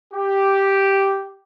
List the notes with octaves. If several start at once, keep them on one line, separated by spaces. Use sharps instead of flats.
G4